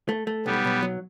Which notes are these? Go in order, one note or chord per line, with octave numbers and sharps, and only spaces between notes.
A3
A3
B1 G3 B3
B1
F#3